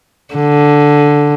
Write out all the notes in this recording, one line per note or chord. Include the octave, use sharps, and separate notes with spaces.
D3